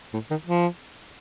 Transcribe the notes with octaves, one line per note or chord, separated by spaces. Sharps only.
A2
D#3
F3